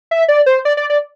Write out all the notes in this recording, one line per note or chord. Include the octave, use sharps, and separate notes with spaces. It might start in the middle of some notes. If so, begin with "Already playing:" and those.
E5
D5
C5
D5
D5
D5